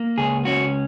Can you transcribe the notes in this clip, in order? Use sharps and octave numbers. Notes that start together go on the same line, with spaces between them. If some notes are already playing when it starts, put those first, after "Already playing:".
Already playing: A#3
C#2 G#4
C#4 F#4